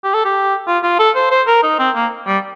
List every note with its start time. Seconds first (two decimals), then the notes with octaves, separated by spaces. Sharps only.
0.04 G4
0.14 A4
0.25 G4
0.67 F4
0.83 F4
0.99 A4
1.15 C5
1.31 C5
1.47 A#4
1.63 D#4
1.79 C4
1.95 A#3
2.27 G3